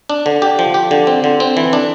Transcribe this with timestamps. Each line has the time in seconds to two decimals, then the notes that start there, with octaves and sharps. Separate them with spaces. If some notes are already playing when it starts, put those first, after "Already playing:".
0.10 D4
0.26 D3
0.42 G4
0.59 F3
0.74 G4
0.91 D3
1.07 C4
1.24 D3
1.40 C4
1.57 E3
1.73 D4